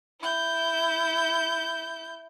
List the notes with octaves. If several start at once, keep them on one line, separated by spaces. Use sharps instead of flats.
E4 G6